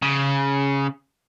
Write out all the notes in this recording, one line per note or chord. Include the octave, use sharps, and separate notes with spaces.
C#3